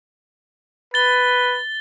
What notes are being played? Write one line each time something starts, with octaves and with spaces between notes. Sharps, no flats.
B4 A6 G7